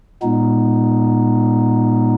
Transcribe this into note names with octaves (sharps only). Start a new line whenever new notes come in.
A#2 G#3 B3 D#4